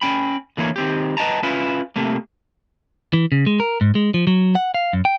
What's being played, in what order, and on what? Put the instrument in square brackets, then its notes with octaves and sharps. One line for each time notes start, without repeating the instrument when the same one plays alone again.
[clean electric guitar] C#4 G5 B5
D3 E3 A#3 C#5
D#3 C4 G4
B4 D#5 G5 A5 A#5
C#4 E4 F4 B4
C3 A3 A#3
E3
C#3
G#3
A#4
G#2
G#3
F3
F#3
F#5
F5
F#2
G5